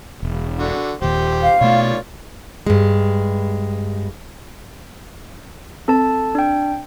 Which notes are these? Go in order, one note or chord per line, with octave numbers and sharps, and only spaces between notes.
E1
D3 F#4
D#1 D#2 G4 C5
F5
B2 A3 F4 C#5 D5
G2 G#3
C4 A4 A5
D4 G5